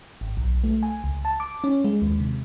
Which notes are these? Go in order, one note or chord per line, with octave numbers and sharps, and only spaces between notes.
G#1
B1
A3
G#5
C#2
A5
D6
C#4
G#3
D#2
C3